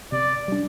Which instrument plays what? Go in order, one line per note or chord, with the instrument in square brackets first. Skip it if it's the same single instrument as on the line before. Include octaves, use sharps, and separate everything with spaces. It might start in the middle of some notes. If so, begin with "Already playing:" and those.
[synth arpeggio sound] C3 [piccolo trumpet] D5
[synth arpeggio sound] G3 D4